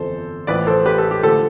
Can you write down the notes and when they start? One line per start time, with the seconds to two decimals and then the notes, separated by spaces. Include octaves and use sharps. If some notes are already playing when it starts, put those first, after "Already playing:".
Already playing: G1 F2 E3 A4 C5
0.47 A1 A2 F3 B4 D5
0.67 A4 C5
0.85 G4 B4
0.98 A4
1.11 G4
1.23 D3 F3 A3 A4